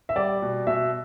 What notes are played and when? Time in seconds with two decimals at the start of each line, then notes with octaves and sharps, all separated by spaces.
0.09 E5
0.16 G3 D5
0.42 B2
0.67 B2 E5